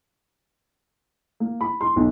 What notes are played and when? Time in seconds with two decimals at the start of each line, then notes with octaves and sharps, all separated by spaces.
1.40 A#3
1.61 B5
1.81 C6
1.96 B1